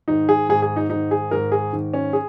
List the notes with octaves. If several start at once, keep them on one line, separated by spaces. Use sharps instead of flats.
G#2 D#3 D#4
G#4
G#2 D#3 G#4
G#4
D#4
G#2 D#3 D#4
G#4
G#2 D#3 A#4
G#4
G#2 D#3
C#4
G#4